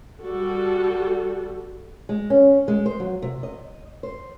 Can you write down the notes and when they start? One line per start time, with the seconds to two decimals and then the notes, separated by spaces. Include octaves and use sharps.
0.21 G3 F#4 A4
2.09 G#3
2.30 C#4
2.68 G#3
2.86 C5
3.00 F#3
3.22 C3
3.43 D#5
4.03 C5